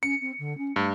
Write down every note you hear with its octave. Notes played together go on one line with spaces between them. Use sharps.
C#4 C#7
C4
D3
C#4
G2 A3